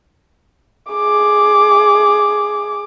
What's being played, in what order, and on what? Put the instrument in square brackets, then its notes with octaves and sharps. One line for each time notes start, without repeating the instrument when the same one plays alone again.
[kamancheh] G#4 D6